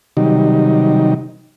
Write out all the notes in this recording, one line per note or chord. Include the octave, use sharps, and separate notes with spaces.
C3 D#3 F#3 G3 D#4